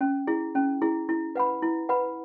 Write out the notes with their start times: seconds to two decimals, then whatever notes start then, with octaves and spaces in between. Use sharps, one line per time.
0.01 C#4
0.27 E4 G#4
0.55 C#4
0.82 E4 G#4
1.09 E4
1.35 B4 F#5 B5
1.62 E4
1.89 B4 F#5 B5